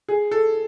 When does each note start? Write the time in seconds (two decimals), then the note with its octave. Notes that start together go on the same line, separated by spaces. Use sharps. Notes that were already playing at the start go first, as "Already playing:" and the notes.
0.08 G#4
0.31 A4